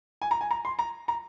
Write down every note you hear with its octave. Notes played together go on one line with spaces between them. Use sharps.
G#5
A#5
G#5
A#5
C6
A#5
A#5